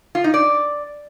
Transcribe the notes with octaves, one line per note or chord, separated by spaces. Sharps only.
F4
D#4
D5